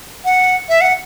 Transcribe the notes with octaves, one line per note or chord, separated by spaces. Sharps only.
F#5
E5
F#5